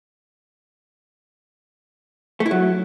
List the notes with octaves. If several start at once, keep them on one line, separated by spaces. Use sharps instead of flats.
A3
E4
F#3